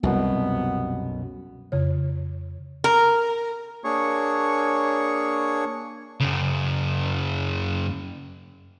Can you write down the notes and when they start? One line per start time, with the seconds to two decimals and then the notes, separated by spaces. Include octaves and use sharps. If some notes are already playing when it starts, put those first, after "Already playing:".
0.03 C2 F#2 B2 B3
1.72 F2 C#3 C#5
2.84 A#4
3.84 A#3 D4 G#4 C#5 C#6
6.20 F#2 C#3